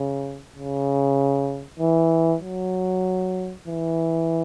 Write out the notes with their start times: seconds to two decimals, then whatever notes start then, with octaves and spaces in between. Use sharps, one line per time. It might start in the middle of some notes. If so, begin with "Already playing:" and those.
Already playing: C#3
0.54 C#3
1.80 E3
2.42 F#3
3.68 E3